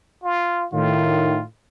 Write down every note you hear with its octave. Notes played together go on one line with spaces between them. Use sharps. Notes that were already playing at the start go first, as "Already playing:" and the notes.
F4
A2 D#3 F4